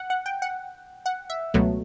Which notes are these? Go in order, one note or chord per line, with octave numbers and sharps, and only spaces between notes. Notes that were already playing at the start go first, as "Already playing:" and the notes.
Already playing: F#5
F#5
G5
F#5
F#5
E5
C#2 B2 F#3 A3